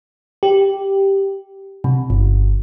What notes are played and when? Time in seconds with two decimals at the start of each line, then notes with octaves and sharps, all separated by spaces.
0.43 G4
1.84 C3
2.10 G1